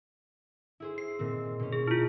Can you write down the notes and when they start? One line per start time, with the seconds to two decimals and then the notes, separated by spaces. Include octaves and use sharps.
0.80 E4 G#4 C5
0.98 C7
1.19 A#2 D#3 C4
1.59 B2 C#4
1.73 G#4
1.88 E4 F4